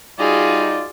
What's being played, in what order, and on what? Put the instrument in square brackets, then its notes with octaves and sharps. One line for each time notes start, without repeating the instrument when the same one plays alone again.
[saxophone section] G3 D#4 [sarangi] F4 [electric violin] F#4 G#4 [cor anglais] D5